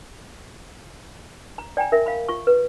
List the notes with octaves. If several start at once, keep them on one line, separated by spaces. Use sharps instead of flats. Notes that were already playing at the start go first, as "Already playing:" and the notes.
A#5
D5 G5 G#5 A#5
A#4 E5
F5 B5
F4 C#6
B4